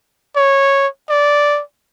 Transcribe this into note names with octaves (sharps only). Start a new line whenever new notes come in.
C#5
D5